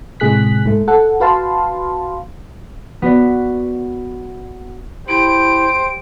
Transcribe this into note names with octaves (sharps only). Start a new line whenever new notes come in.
A2 C3 G#3 G#4 F#6 B6
G#2 A3
A4 F#5
F#4 B4 F5 A5 C6
B3 F#4 B4 D5
E4 G4 C5 D7